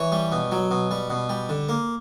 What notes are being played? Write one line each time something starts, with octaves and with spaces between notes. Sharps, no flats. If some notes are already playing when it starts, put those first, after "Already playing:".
Already playing: E3 C#5
G3
B2
F#3
B2
G3
B2
G3
D3
A#3